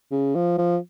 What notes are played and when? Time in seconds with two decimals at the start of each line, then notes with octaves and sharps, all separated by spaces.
0.12 C#3
0.35 F3
0.58 F3